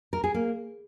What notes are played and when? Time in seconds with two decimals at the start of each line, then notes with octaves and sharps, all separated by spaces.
0.13 A#4
0.24 G#4
0.34 A#3